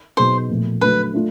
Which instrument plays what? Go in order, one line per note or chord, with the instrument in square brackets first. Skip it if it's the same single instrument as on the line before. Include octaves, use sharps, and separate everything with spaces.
[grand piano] B2 F#3 B3 D#4 G#4 [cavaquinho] C5
[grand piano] A#2 F3 A3
[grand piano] D3 F#3 A3 [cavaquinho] B4
[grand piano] A3 D4 F4